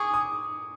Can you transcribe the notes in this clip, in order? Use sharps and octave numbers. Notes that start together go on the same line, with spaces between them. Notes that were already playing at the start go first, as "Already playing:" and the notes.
Already playing: G#4 C#6 D6
D#6